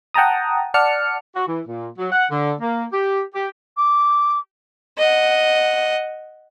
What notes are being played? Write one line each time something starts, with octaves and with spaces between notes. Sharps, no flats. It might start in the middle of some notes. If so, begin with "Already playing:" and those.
F#5 G5 A5 A#5 D#6
D5 F#5 A5 F6 C#7
F#4
E3
A#2
F#3
F#5
D3
A#3
G4
G4
D6
D#5 F#5